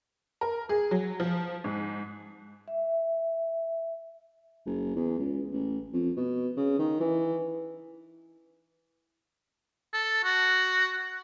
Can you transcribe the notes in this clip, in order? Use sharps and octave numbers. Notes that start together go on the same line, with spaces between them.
A#4
G#4
F#3
F3
G#2
E5
F#1
E2
C#2
A1
F2
B2
C#3
D#3
E3
A4
F#4